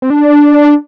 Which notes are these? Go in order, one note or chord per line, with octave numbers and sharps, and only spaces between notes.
C4
D4